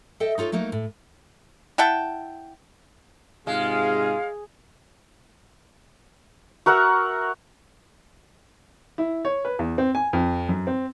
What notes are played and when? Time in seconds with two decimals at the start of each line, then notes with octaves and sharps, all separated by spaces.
0.20 A4 D#5 E5 G5
0.38 D#4 F4 A4 C#5
0.52 F#3 A3 A#3 D#4
0.72 A2
1.78 E4 F#5 G5 A5
3.47 G#2 C3 G#3 F4 G#4 F5
6.66 F#4 A#4 E5 F#5
8.98 E4
9.25 C#5
9.45 B4
9.59 E2
9.78 C4
9.95 G#5
10.13 F2
10.49 F#2
10.67 C4